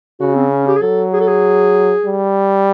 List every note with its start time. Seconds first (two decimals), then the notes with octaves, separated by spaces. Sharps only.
0.20 C#3 F#4
0.35 C4
0.52 C#4
0.67 G4
0.76 G#4
0.82 F#3 A4
1.13 G#4
1.21 A4
1.28 G#4
2.06 G3